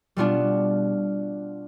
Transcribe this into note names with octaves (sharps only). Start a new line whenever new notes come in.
B2 G3 B3 D4 F4